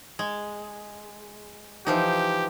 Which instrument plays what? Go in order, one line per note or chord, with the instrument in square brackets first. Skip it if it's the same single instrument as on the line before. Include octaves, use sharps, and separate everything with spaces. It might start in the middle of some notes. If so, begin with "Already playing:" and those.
[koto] G#3
[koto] E3 F3 D#4 [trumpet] G4